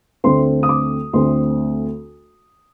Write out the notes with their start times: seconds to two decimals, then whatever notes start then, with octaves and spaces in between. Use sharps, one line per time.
0.24 D2 D3 A3 C4 C6
0.63 D#6
0.69 D6
1.13 D2 D3 A3 C4 C6